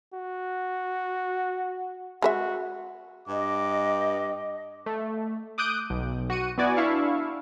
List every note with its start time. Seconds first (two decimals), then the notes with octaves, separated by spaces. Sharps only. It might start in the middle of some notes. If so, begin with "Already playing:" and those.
0.14 F#4
2.22 G#3 F#4 B4 E5
3.28 G2 D#5 D6
4.86 A3
5.58 D6 D#6 F#6 G6 D7
5.90 B1
6.30 F#4 C#7 D#7
6.58 B3 E4 F#4 D5 G#5
6.77 D4 E4 E5 F5 C#6